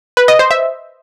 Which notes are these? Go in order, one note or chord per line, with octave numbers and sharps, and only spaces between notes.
B4
D#5
C5
E5